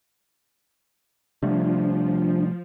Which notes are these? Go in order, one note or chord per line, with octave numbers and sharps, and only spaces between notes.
C3 F3 G3 A3 D4